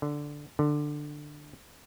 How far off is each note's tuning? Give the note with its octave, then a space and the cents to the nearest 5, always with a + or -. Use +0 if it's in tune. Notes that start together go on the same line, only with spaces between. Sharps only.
D3 +0
D3 +15